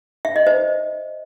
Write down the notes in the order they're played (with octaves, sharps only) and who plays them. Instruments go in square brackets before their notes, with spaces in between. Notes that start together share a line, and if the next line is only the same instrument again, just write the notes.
[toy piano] E5
D#5
C5